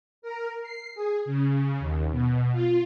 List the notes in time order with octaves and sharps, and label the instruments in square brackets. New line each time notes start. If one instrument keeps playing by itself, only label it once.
[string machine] A#4
C7
G#4
C#3
D#2
B2
F4